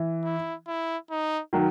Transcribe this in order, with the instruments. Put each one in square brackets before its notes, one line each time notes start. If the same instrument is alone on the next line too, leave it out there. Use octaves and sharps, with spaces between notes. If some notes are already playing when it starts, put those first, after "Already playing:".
Already playing: [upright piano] E3
[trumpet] E4
E4
D#4
[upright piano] D#3 F#3